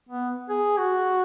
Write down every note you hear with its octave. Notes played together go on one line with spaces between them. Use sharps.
B3
G#4
F#4